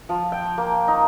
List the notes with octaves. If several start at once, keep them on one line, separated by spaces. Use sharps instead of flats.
F3
G5
A#3
D#4